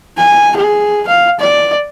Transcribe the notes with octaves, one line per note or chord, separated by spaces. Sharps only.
G#5
G#4
F5
D5